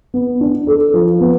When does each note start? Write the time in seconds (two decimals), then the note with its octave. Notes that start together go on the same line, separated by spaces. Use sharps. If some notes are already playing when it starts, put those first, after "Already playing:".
0.14 B3
0.41 D4
0.67 A4
0.94 F3
1.21 B3